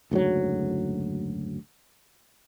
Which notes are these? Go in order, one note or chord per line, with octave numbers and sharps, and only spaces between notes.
F#1 D2 G#2 F#3